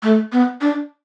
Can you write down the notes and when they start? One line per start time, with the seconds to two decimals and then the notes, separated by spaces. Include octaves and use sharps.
0.03 A3
0.32 B3
0.61 D4